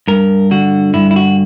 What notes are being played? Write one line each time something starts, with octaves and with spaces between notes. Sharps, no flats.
G2 A#4
D3 F#4
G2 E4
E4
F#4